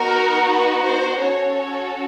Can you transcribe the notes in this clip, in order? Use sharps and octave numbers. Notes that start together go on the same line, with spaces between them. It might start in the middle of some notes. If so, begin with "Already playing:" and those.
Already playing: B3 D#4 F#4 A#4
B4
C5
C#4 F#4 A4 C#5
C#5